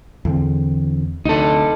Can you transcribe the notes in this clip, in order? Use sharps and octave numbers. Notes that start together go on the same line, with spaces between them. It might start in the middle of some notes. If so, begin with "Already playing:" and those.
E2 D3 C4
D2 D#4 A4